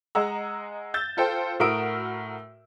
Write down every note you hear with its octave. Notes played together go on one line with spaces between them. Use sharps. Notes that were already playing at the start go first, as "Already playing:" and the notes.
G#3 D#5 F#5 A#5 E6
E6 G6 A6
F4 A4 C5 G5
A2 F#4 A#4 D#6 E6 D7